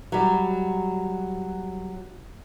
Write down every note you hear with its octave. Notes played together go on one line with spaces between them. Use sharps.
F#3 G3